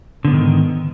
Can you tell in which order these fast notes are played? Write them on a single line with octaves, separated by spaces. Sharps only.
D3 B3 G#2 D#3